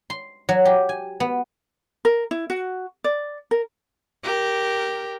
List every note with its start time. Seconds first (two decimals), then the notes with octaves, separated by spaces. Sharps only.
0.10 C6
0.49 F#3
0.65 G4
0.89 G#5
1.20 B3
2.05 A#4
2.31 E4
2.50 F#4
3.04 D5
3.51 A#4
4.24 G4 A#4